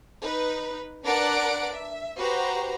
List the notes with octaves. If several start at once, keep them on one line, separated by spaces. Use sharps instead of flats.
D#4 B4
D4 A#4 B4 D5 F#5 D7
E5
F#4 G4 B4 C5 A#5